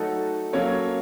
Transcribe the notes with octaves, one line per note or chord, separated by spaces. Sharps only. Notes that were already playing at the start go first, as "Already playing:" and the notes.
Already playing: F#3 A3 D#4 F#4 A4
F#3 A#3 C#4 A4 C#5